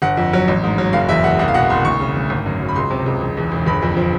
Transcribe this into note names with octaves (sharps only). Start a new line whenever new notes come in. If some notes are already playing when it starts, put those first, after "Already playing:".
G1 F#5
F2
F#3
A1
G#2
F#3
F#1 F5
E2 E5
F#1 F#5
C2 F#5
F5
B2 F#5
C2 C6
D2 C#6
C#3
D2
G#1
F#2
F#3
B5
C#2 C6
C3
C#2
E1
E2
E1
G1 B5
F2
F3